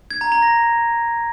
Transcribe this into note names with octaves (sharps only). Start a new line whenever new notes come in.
G#6
A#5
A#5
A#6